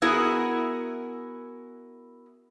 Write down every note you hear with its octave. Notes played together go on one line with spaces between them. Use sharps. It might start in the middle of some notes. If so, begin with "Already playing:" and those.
B3 E4 F#4 G#4 A#4